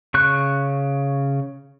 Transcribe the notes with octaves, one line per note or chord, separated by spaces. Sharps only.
C#3 C#6 F#6